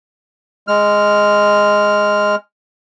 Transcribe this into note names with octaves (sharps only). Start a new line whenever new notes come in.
G#3 F6